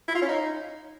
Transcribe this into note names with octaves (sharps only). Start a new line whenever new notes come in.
E4
F4
C#4
D#4